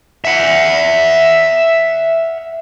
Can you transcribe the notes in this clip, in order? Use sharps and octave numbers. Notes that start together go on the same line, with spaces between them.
E5 F#5